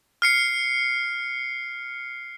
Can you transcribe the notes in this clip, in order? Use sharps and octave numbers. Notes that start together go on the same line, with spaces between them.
F6 C7 C#7